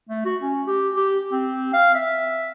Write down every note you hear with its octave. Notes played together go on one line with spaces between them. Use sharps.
A3
F#4
C#4
G4
G4
C4
F5
E5